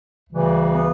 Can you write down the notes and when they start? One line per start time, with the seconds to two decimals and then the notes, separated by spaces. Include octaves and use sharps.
0.30 D2 C#3 E3 G3
0.70 B3